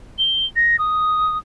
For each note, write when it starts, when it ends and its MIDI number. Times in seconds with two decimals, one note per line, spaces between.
0.18 0.46 103
0.56 0.77 94
0.79 1.38 87